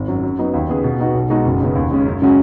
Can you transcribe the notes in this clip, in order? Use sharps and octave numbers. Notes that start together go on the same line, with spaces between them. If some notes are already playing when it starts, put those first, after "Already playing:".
Already playing: G#1
F#2 F#3
F#2
F#3 B3 D#4
D#2
C#3 B3 G#4
B2
B3 D#4 F#4
B1
B2 G#3 D#4 F#4
F#1
F#2 C#3 B3
D#2
C#3 G#3 C#4
F#2
C#3 G#3 C#4 F#4